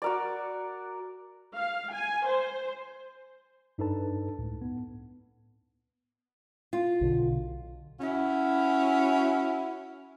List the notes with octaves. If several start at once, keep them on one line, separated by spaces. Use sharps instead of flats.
F#4 A#4 D5
F5
G#5
C5
G2 D4 D#4 A4 B4 A5
C#2 A2
B3
F4
B1 B2 D3
C#4 E4 F#4